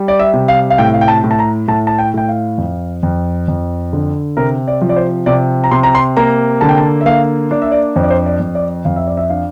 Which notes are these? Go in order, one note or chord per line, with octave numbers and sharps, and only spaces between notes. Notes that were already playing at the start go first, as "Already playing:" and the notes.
Already playing: G3
D5
E5
C3
F5
F5
A2 G5
F5
G5
A5
A2
A5
A#5
A2 A5
A5
G5
A2 G5
F5
F2
F2
F2
D3
C3 A#4
D5
F3
D5
C5
C3 D5
A#5
C3 C6
A#5
C6
A#3 A#5
D3 A5
G5
A5
E5
A#3 F5
D4 D5
E5
D5
F2 C5
D5
C5
D5
F2
D5
F2 F5
E5
D5
E5
D4 F5